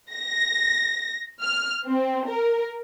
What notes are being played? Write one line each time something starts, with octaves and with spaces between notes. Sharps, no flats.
A#6
F6
C4
A#4